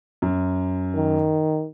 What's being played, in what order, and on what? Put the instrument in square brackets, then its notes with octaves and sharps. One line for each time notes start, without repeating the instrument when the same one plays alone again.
[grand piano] F#2
[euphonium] D#3